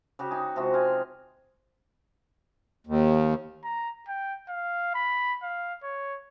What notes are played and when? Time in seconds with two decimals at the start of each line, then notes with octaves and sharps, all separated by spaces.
0.19 C#3 F#4 G4
0.31 D#4 G#4
0.56 C3 F3 G#3 F#4
0.74 F5 G#5
2.87 D#2
3.64 A#5
4.08 G5
4.49 F5
4.94 B5
5.43 F5
5.83 C#5